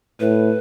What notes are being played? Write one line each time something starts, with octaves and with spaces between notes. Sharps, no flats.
A2 B4